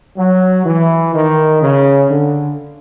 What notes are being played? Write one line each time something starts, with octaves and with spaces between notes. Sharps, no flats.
F#3
E3
D#3
C#3
D3